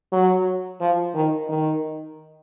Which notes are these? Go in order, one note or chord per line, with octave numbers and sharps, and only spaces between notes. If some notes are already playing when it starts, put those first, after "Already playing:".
F#3
F3
D#3
D#3